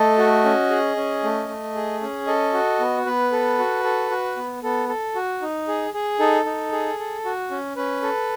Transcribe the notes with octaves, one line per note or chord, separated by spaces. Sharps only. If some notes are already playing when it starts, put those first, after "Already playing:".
Already playing: A3 A4 D#5
F#4
C#4
G#4
C#4
A3
A3
G#4
C#4
A4 D#5
F#4
B3
B3 B4
A4
F#4
A4
F#4
B3
B3 A4
A4
F#4
D#4
G#4
G#4
D#4 A4
D#4
G#4
A4
F#4
C#4
C#4 B4
A4